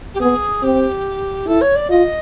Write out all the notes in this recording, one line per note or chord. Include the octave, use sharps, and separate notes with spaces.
G4
B3 G#4
C4 G4
E4 A4
C#5
D5
F4 D#5